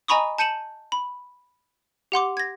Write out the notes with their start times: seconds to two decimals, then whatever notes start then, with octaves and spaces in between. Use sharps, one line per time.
0.08 D#5 G#5 A#5 B5 C#6 D#6
0.38 A5 G6 C#7 D#7 E7 F#7
0.92 B5
2.12 G4 F#5 C6 D6
2.37 G#6 A#6